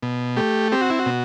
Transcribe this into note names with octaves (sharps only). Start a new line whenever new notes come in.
B2
A3 G4
C4 G4
F#4
E4
F#4
B2